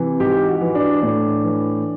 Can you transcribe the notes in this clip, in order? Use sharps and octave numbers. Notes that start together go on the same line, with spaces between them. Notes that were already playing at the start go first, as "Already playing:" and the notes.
Already playing: C3 E3
G#2 G4
F#4
E3
D4
A2 D4
E3